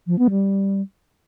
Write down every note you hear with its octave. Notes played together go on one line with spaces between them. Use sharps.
F3
B3
G3